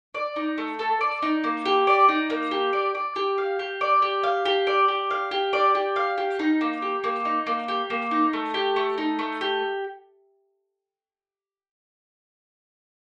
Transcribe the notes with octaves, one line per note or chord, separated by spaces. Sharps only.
D5
D#4
A3
A4
D5
D#4
A#3
G4
D5
D#4
A#3
G4
D5
D5
G4
F5
G4
D5
G4
F5
G4
D5
G4
F5
G4
D5
G4
F5
G4
D#4
A#3
G4
A#3
D#4
A#3
G4
A#3
D#4
A3
G4
A3
D#4
A3
G4